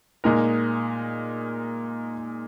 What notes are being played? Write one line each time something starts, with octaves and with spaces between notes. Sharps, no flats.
A#2 G#3 D#4 A#4